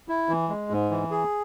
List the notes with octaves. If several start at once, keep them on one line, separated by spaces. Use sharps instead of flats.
E4
E3
G#3
G#2
E3
G#4